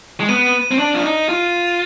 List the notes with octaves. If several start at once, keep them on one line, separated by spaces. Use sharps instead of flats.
G#3
B3 D#7
C4
D4
F4
D#4
F4